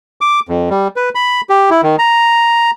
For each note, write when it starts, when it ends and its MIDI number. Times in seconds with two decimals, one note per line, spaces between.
0.21 0.40 86
0.49 0.69 41
0.70 0.88 55
0.96 1.09 71
1.15 1.41 83
1.49 1.70 67
1.70 1.81 64
1.83 1.96 51
1.99 2.71 82